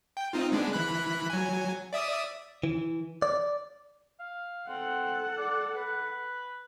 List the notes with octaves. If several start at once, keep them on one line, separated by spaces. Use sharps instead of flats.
G5
C4 D#4 F4
G#3 B3 D4
E3 B5 F#6
F#3 G#5
D5 E5 D#6
E3
D5
F5
C4 A4 F#5
D5
B4